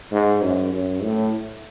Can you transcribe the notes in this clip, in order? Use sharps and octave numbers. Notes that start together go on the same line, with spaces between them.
G#2
F#2
F#2
A2